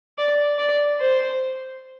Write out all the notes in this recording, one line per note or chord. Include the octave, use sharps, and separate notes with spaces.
D5
D5
C5